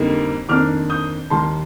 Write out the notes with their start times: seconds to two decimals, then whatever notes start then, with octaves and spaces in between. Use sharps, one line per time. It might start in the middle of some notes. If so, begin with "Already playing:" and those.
Already playing: F2 D3 G3 A#3 D#4
0.49 F2 D#3 A#3 D4 D6 F6
0.90 D#6 G6
1.30 D#2 D#3 G3 A5 C6